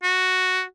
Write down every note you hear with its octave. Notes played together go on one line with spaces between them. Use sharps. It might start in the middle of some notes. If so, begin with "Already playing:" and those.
F#4